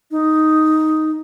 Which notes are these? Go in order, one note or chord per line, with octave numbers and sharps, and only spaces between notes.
D#4